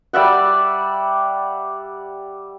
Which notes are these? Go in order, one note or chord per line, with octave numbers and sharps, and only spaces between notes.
G3 D5 E5 F#5